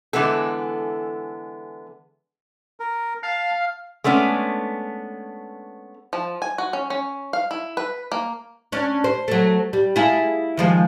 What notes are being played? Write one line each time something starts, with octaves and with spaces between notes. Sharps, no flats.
D3 E3 G#3 B3 A4
A#4
F5 A5
G#3 A3 B3 C#4 D4
F3
G#5
F#4
C#4
C#4
F5
E4
B4
A#3
C#4 D4
C5
F#3 A3
G3
E4 F4 G#4
D#3 F3 G#3